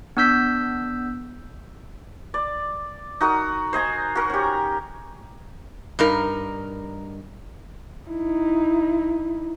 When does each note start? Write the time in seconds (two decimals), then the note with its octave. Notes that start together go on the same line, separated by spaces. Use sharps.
0.17 B3 D4 E6 G6 B6
2.34 D5
3.21 D#4 F#4 A#4 D#6
3.73 C5 D#5 G#5 A#5
4.15 F#4 A#4
4.30 C#4 G4
5.99 G2 D#4 A#4
8.09 D#4 E4